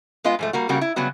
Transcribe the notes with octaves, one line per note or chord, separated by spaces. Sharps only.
G#3 B3 F4 D#5
G#2 F3 A3
G3 A#3 F#4
C#3 G3 A#3 F#4
E4
C#3 F#3 G3 B3 F#4